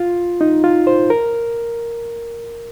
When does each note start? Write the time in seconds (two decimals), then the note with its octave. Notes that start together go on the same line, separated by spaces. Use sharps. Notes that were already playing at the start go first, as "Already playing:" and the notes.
Already playing: F4
0.41 D#4
0.64 F4
0.87 C5
1.10 A#4